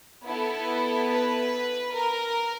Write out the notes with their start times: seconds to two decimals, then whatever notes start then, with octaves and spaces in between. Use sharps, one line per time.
0.25 B3 E4 A4
1.10 B4
1.95 A#4